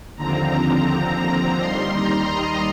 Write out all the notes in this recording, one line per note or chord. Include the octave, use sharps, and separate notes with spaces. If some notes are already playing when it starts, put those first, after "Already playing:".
D#2 D3 F3 C4 A#5
A#5
A#5
D#2 D#3 G3 C6
A#5
D#5